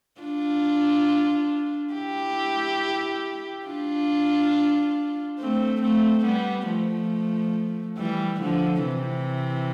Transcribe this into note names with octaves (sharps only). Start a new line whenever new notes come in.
D4 F4
E4 G4
D4 F4
A3 C4
A3 C4
G3 B3
F3 A3
E3 G3
D3 F3
C3 E3